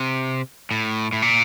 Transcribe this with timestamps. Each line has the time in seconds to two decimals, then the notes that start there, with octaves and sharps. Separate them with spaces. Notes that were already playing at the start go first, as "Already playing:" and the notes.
Already playing: C3
0.71 A2
1.13 A2
1.22 A#2